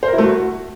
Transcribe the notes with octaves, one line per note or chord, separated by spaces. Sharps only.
C5
A#4
E4
A3
F#4